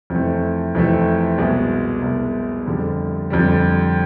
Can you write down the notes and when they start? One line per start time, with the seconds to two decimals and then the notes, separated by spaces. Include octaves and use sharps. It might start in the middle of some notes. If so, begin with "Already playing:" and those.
0.10 F2 C3 E3 A3
0.75 F2 C3 E3 A3
1.38 C2 B2 G#3
2.02 C2 B2 G#3
2.67 F2 D3 G3
3.30 F2 D3 G3